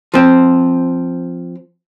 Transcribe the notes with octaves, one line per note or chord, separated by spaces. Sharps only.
F3 C4